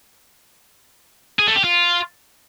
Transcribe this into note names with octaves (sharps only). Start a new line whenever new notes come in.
G#4
A3
G4
F4